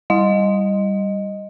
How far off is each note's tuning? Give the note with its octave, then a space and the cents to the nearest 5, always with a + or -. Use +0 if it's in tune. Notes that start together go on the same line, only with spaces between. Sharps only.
G3 +0 D#5 +0